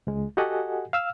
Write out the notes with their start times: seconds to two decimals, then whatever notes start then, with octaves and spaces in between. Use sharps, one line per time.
0.07 C#2 G#3
0.37 F#4 G4 A4 D#5 F#5 G#5
0.93 F5 E6 F6